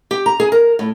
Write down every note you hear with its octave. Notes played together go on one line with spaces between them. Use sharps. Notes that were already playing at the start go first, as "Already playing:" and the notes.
G4
A#5
G#4
A#4
A2